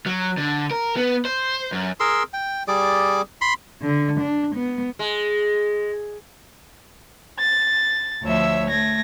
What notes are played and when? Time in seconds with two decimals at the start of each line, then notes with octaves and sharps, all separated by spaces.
0.06 F#3
0.37 D3
0.71 A#4
0.97 B3
1.25 C5
1.72 F#2
2.00 G#4 A#4 C6 E6
2.33 G5
2.68 G3 G#4 D5 D6
3.41 B5 C6
3.82 D3
4.20 D4
4.55 B3
4.99 G#3
7.38 A6
8.23 D2 F3 C#5 E5 E6
8.69 A3 G#6 A#6